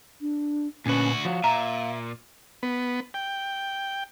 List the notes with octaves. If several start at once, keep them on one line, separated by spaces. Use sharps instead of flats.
D4
D2 A#2 C#4 F#4 B4
F3 F#4 F5
A#2 E5 A#5
B3
G5